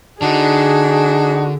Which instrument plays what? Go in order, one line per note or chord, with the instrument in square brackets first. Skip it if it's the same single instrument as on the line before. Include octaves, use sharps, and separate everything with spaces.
[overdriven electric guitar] D3 [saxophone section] D4 D#4 F#4 [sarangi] G#4